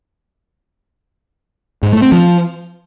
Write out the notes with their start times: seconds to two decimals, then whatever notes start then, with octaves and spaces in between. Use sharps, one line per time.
1.83 G#2
1.92 A3
2.02 C4
2.12 F3